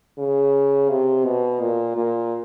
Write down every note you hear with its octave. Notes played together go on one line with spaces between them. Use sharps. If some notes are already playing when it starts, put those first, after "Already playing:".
C#3
C3
B2
A#2
A#2